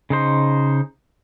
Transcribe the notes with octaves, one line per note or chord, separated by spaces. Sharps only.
C#3 D#4 C5